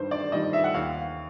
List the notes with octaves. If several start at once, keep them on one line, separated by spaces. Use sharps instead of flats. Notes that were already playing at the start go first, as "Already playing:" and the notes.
Already playing: G2 D#3 G3 C5
D5
D#3 G3 D#5
E5
F#5
D#2 F5